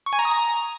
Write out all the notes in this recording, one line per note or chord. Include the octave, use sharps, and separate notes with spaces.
C#6
G#5
A#5
D#6
A#5